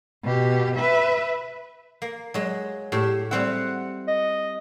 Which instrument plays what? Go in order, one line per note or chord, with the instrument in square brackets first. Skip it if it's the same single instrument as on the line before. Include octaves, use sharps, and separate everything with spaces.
[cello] B2 G4
B4 E5
[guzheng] A#3
F#3 G#3
[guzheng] A2 E5 [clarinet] G4
[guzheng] G3 C4 E4 [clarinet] F#5
[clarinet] D#5